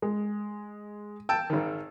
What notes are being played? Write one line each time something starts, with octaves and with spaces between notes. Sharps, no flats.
G#3
G5 A5 E6
G#1 D#3